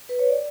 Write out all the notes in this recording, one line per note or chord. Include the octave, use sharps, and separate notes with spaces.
B4
C#5
D5